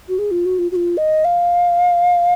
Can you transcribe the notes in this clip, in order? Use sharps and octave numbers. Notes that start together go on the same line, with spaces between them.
F#4
G#4
F4
F#4
F4
F#4
F4
D#5
F5